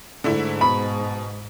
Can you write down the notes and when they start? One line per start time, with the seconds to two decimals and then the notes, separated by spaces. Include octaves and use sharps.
0.24 G#2 D3 A3 E4
0.61 B2 B5